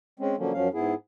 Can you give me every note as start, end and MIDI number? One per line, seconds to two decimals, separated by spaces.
0.20 0.36 56
0.20 0.36 60
0.20 0.36 61
0.38 0.53 50
0.38 0.53 53
0.38 0.53 54
0.38 0.53 58
0.38 0.53 61
0.54 0.68 42
0.54 0.68 53
0.54 0.68 54
0.54 0.68 61
0.54 0.68 77
0.73 0.94 44
0.73 0.94 59
0.73 0.94 64
0.73 0.94 68